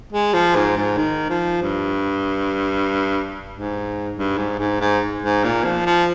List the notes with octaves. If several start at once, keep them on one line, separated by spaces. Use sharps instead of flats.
G#3
F3
G#2
G#2
D#3
F3
G2
G#2
G2
G#2
G#2
G#2
G#2
A#2
F3
F3